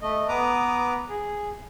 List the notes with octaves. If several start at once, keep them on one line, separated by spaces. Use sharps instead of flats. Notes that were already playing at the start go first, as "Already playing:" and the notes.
A3 D#5
B3 B4 A#5 D6 D#6
G#4